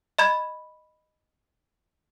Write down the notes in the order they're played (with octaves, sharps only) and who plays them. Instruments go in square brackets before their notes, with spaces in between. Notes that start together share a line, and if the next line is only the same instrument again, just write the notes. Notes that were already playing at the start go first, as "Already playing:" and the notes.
[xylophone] D#5 B5 G#6